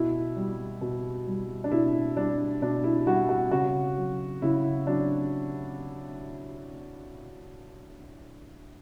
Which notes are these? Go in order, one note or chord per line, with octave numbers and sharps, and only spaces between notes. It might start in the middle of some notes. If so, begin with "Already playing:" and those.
Already playing: B2 E4
G3
B2
G3
D4
B2 E4
G3 D4
B2 D4
E4
G3 F#4
F#4
C#3 F#4
F#3
C#3 E4
F#3 D4